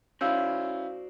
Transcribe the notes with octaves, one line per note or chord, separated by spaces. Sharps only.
C#4 E4 F#4 C5 D5 F5 E6 G6